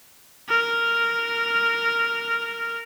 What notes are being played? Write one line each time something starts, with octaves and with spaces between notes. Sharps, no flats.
A#4 F6